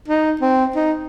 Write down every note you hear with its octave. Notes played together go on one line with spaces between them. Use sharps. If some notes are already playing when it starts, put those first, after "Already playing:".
D#4
C4
D#4